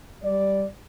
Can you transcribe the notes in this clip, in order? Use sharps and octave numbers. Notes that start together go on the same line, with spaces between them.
G3 D5